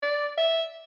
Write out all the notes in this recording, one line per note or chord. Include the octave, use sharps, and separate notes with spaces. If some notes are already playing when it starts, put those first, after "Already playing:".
D5
E5